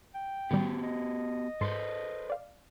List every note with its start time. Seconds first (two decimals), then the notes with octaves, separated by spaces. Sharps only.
0.14 G5
0.51 A2 D#3 G3 B3 F#4 G4
0.83 D#5
1.61 G#2 A4 B4 C5 C6
2.30 D5 F5